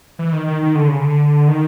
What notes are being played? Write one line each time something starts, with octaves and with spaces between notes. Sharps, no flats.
E3
D#3
D#3
D#3
D3
C#3
D3
D#3